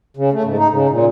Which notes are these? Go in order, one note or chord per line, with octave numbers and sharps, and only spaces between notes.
C#3
A3
G#2
D#4
C#3
A#2